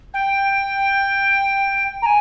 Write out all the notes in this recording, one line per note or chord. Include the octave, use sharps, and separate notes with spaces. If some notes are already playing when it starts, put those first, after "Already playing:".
G5
A#5
G#5